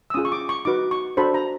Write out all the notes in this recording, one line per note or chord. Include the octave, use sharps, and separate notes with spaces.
E6
C#4 F4 G#4 D#6
C#6
D6
C#6
D#4 F#4 B4 D6
C#6
D4 F#4 A4 C5 B5
A#5